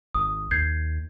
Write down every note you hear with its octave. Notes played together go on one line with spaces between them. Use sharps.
G#1 D#6
D#2 G6 G#6 C7